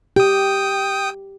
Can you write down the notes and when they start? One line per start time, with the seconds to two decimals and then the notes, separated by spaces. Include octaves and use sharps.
0.16 G4 G5 D#6